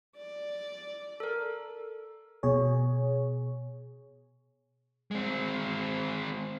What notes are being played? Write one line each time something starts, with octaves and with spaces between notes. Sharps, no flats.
D5
A4 A#4
B2 G#4 C#5
G#3 C4